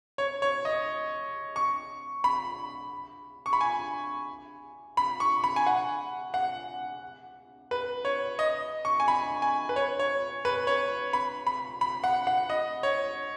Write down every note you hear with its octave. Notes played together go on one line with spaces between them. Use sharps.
C#5
C#5
D#5
C#6
B5
C#6
B5
G#5
B5
C#6
B5
G#5
F#5
F#5
B4
C#5
D#5
C#6
G#5
B5
G#5
B4
C#5
C#5
B4
C#5
B5
B5
B5
F#5
F#5
D#5
C#5